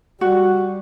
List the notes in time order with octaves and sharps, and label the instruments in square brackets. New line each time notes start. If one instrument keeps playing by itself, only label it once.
[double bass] G3 [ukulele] F#4